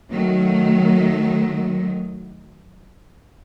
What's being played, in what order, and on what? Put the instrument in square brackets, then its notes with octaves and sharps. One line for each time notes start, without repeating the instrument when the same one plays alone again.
[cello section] D#3 F#3 A3